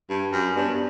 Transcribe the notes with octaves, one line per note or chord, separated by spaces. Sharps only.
G2
F#2
G2 B3 D4